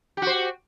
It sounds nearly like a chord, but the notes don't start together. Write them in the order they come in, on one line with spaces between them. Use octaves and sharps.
G4 F#4 C5